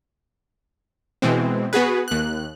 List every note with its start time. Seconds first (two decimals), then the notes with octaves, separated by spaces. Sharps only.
1.22 B2 E3 G#3 C4
1.73 B3 F#4 G#4 B4
2.08 D#2 F#6